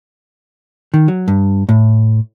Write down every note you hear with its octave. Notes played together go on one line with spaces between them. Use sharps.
D#3
F#3
G2
A2